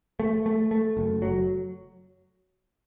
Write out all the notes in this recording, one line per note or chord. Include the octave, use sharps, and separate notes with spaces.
A3
A3
A3
F#1
F#3